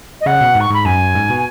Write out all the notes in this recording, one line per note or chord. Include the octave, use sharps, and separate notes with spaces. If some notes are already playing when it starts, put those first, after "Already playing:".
D#5
C#3 F#5
B2
G#2
C#6
G#2 B5
F#2 G#5
G#2
B2